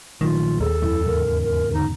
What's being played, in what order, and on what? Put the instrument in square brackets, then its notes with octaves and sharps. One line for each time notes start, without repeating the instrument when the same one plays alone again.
[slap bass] A#1 F#3 A3 [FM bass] D#3 [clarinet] F4
[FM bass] D#2 [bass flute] G#4 [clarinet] A4
[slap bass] F2 G#3 [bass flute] E4
[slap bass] E2 G#2 C#3 [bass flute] A#4
[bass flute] A#4
[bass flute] D3 [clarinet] D#4